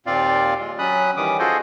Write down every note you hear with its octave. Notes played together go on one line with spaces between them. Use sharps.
D#2 A#2 C4 F4 D5 F5
G#3 F4
F#3 C#4 B5 D#6 F#6
D#3 E3 G3 C#4 D6 D#6
F4 F#4 G#4 A4 C5 D#5